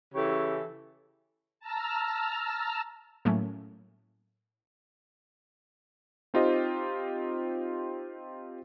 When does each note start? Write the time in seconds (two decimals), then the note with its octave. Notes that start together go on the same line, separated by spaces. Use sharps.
0.15 C#3 E3 G4 A4 C#5
1.60 A5 A#5 E6 F6
3.25 A2 F#3 A3 A#3 C#4
6.34 C4 D#4 F4 G4 C5 D#5